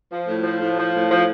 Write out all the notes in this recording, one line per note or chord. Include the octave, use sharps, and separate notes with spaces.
F3
A2
F3
A2
F3
A2
F3